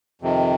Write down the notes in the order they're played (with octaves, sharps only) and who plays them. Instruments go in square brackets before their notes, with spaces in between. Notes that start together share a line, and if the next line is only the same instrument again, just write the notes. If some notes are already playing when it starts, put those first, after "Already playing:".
[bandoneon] F2 C3 D#3